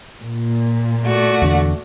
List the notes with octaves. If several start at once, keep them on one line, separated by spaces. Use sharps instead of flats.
A#2
A3 F#4 D5
E2 D3